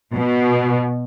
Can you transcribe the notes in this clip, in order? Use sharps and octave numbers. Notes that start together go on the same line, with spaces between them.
B2